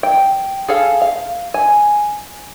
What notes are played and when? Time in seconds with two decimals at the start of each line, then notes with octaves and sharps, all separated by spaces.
0.03 G5
0.68 G#4 A4 F5
1.02 F5
1.54 G#5